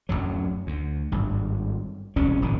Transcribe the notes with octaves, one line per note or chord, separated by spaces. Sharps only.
D1 C2 F#2 F#3
D2
G#1 G2
E1 C2 G3 C#4
D#1 G#1 F2 D#3